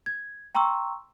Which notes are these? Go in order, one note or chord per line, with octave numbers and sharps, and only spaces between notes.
G#6
G5 A#5 C6 C#6 E6